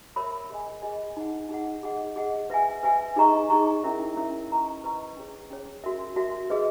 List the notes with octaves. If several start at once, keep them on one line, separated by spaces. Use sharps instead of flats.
A#4 C#5 E5 B5
G#4 D#5 G#5
G#4 D#5 G#5
D#4 G#4 D#5 F#5
D#4 G#4 D#5 F#5
G#4 D#5 F#5
G#4 D#5 F#5
B4 E5 G#5
B4 E5 G#5
D#4 G#4 D#5 A#5 C#6
D#4 G#4 D#5 A#5 C#6
C#4 E4 A#4 C#5 E5
C#4 E4 A#4 C#5 E5
B4 D#5 A#5 C#6
B4 D#5 A#5 C#6
C#4 G#4 C#5
C#4 G#4 C#5
F#4 A#4 E5
F#4 A#4 E5
G#4 B4 D#5